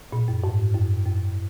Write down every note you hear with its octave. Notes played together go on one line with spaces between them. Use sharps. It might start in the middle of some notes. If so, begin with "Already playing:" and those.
A#2
F#2
G#2
F#2
F#2